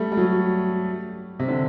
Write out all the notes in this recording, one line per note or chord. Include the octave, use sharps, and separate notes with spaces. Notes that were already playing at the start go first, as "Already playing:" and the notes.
Already playing: G3 A3
G3
F#3
C3
D3